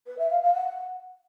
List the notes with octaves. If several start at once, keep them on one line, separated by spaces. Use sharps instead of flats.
B4
E5
F5
F5
F#5